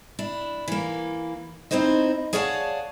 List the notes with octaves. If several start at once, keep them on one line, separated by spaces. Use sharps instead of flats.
D4 E4
E3 A#3
C4 D#4 E4 C5 D#5
G#4 C#5 D5 F5 F#5 A5